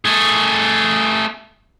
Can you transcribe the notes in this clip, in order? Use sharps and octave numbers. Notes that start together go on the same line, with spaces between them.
A3 G#4